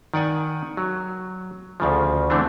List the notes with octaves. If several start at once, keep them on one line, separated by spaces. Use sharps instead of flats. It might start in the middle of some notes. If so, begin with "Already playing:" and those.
D#3 D5 F#5 G#5
F#3
D2 C#3 F3
D3 E3 A3 C4 D4